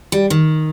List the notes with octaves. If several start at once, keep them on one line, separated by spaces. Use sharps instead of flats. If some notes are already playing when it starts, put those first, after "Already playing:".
G3
D#3